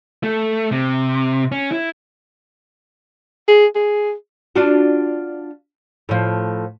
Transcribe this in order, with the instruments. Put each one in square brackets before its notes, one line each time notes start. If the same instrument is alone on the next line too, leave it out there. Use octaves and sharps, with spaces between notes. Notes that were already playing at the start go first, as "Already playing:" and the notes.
[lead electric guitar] A3
C3
C#4
E4
[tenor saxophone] G#4
G#4
[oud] D4 F4 F#4
A2 F3